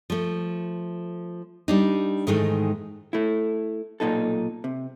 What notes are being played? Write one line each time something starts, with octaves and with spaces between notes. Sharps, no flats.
F3 A3
G3 D4 D#4
G#2 D#3 E3 G#3 A3 D#4
A3 E4
B1 A#2 D#4 A4
C3